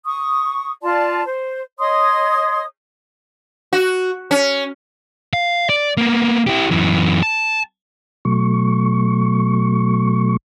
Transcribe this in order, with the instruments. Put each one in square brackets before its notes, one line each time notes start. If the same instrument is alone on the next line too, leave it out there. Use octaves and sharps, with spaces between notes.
[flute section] C#6 D#6
F4 D5 A5 C6
C5
C#5 D#5 C6 D#6
[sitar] F#4
C#4
[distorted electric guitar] F5
D5
A#3 B3
E4 G4
F#2 E3
A5
[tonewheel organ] B2 F#3 A3 C#6